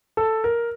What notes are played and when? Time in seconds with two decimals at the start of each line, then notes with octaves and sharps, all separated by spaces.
0.17 A4
0.44 A#4